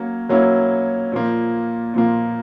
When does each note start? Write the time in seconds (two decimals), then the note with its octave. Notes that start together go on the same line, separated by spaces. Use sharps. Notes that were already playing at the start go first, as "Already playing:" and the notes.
Already playing: F#3 A#3 C#4
0.29 F#3 A#3 C#4 E4
1.12 A#2 F3 A#3
1.94 A#2 F3 A#3